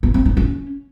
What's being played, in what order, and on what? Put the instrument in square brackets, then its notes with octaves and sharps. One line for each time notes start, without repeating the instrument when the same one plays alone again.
[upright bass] B3
C4
D#4
C#4